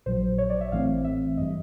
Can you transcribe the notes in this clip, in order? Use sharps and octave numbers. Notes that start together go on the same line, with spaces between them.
A#1 A#2 F#3 C5
C#5
D5
E5
A1 A2 E3 A3 C4 F5
E5
G2 E3 G3 D#5